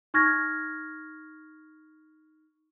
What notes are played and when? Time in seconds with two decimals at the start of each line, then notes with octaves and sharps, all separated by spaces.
0.14 D#4 C#6 F6 G#6 A#6